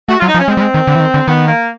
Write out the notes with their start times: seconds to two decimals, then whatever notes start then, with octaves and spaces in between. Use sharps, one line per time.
0.08 A3 F#4
0.19 F#3 F4
0.28 D#4
0.35 F3
0.39 C#4
0.48 G#3 C4
0.57 G3
0.61 G#3
0.74 D#3
0.87 D3
0.95 E3
1.00 D#3
1.14 D3
1.28 D#3 B3
1.47 A#3